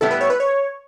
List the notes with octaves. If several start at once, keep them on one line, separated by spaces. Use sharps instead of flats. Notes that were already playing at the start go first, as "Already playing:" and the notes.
A2 G3 B3 E4 A4
B4
C#5
B4
C#5